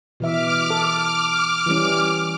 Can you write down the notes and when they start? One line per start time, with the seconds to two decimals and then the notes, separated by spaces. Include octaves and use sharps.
0.20 B2 E3 E5 D6 F6
0.70 A4
1.66 E3 G3 C#4